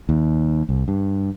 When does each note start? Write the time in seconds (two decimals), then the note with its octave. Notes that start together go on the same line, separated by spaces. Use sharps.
0.09 D#2
0.69 C2
0.88 G2